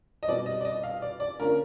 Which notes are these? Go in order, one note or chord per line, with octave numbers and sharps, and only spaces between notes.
D#5
B2 G3 C4 D5
D#5
D5
D#5
F5
D5
D5
D3 F3 A#3 C#4 A#4